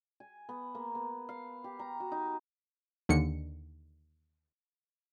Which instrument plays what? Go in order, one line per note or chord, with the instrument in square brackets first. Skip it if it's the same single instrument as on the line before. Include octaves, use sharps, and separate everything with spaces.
[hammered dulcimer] G#5
B3
A#3
B3
F5
G4
A#5
F#4
D#4
[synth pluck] D#2 D3 D#3 C#7